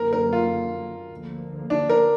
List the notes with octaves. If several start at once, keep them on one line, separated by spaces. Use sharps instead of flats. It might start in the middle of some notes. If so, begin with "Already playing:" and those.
Already playing: F#2 D3 F#3 A#3 A#4
A#4
F4
D2 D3 F3 A#3
D4
A#4